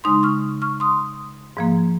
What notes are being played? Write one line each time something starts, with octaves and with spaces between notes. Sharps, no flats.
C#3 G#3 D#4 C6 D#6
C#6 F6
C#6 F6
C6 D#6
G#2 F3 A#3